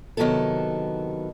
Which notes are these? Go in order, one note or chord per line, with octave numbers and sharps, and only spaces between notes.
C3 D#3 F#3 B3 E4 A4